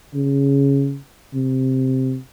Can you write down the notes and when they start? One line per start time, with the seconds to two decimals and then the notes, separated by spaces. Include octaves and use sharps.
0.14 C#3
1.34 C3